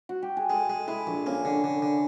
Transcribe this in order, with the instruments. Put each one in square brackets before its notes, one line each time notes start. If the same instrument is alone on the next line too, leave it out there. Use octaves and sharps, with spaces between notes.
[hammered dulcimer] F#4
G4
G#4
[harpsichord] G#3 [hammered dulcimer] A4
[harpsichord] G#3
[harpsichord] G#3 [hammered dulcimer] E4
[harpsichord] A#1
[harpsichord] A#3 [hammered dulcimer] C#4
[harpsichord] D3
D3
D3